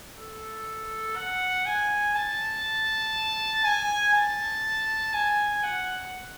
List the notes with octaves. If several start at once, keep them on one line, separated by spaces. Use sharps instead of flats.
A4
F#5
G#5
A5
G#5
A5
G#5
F#5